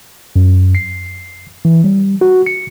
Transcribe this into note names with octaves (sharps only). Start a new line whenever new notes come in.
F#2
C7
E3
G3
F#4
C#7